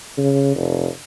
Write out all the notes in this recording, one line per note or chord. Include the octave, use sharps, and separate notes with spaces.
C#3
F1